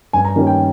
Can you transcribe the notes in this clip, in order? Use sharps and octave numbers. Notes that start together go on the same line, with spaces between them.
G2 G#5
A#5
D#3 G3 A#3 C#4
G5